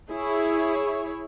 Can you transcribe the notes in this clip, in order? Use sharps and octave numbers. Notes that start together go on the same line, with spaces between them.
E4 G#4 C#5